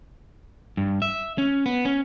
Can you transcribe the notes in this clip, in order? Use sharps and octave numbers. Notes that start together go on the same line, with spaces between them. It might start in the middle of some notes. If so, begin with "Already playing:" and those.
G2
E5
C#4
B3
C#4